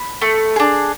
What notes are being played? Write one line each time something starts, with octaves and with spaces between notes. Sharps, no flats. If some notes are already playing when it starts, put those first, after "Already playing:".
Already playing: B5
A3
D4 G#4